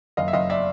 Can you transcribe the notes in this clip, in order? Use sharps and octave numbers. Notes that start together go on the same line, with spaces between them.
F#1 D#5 F5
E5
F#1 D#5 F5
D5 E5